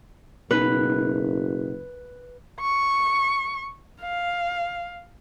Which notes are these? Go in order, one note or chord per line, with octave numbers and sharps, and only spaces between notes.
F#1 B2 D#4 B4
C#6
F5